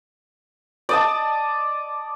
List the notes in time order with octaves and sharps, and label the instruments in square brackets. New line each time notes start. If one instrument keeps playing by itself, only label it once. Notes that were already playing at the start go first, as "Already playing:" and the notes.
[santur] D5 D#5 A5